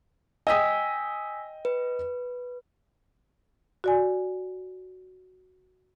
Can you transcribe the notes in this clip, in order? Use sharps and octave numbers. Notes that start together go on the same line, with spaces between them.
D#5 G5 G#5 D#6 E6 B6
B4
F#4 D5 G#5